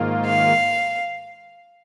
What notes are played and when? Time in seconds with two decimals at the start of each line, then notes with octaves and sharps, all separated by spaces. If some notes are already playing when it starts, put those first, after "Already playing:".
Already playing: G#2 D#3 A#3 F4
0.26 F5